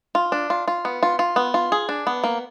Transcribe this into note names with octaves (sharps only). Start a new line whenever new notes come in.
F4
D4
F4
F4
B3
F4
F4
B3
F4
G#4
D4
B3
A#3